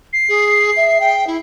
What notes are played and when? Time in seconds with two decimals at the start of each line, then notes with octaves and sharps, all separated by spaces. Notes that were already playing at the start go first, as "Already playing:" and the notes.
0.13 C7
0.28 G#4
0.76 E5
1.00 G5
1.27 E4